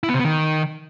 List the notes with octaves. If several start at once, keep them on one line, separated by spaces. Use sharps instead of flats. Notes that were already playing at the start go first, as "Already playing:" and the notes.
E4
B3
C3
B3
D#3